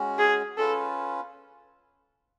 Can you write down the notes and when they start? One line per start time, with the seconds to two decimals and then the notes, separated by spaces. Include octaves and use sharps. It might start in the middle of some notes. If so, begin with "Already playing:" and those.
Already playing: G#3 C#4 F#4
0.19 G#4
0.57 C#4 F4 A4 B4